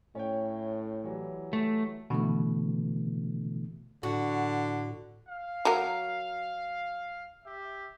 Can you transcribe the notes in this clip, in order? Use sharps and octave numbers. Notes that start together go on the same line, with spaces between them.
A2 C#4 C#5 G5
E3 F#3 G3
A3
B2 D3 E3 A3
A2 D3 F#4
F5
F#3 A#4
G4 E5